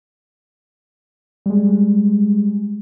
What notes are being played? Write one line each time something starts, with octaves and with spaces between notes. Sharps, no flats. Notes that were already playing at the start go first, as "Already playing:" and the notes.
G3 G#3